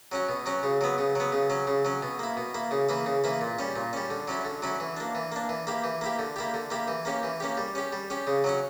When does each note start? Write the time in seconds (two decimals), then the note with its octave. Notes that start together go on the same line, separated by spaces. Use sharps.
0.12 F#3 C#4 F#4
0.28 B2
0.46 F#3 C#4 F#4
0.63 C#3
0.81 F#3 B3
0.98 C#3
1.15 F#3 B3
1.32 C#3
1.50 F#3 C#4
1.67 C#3
1.85 F#3 C#4
2.02 B2
2.19 A#3 E4
2.37 B2
2.54 A#3 E4
2.71 C#3
2.89 E3 A#3 E4
3.06 C#3
3.24 E3 A#3 E4
3.41 A#2
3.59 G3 C#4
3.76 A#2
3.93 G3 C#4
4.10 D3
4.28 F#3 C#4 E4
4.45 D3
4.62 F#3 C#4 E4
4.80 E3
4.97 A#3 D4
5.15 E3
5.32 A#3 D4
5.49 E3
5.67 A#3 E4 G4
5.84 E3
6.01 A#3 E4 G4
6.19 D3
6.36 A#3 E4 G4
6.54 D3
6.70 A#3 E4 G4
6.88 E3
7.05 A#3 C#4 G4
7.23 E3
7.40 A#3 C#4 G4
7.57 G3
7.75 C#4 G4
7.92 G3
8.10 C#4 G4
8.27 C#3
8.44 F#3 C#4 F#4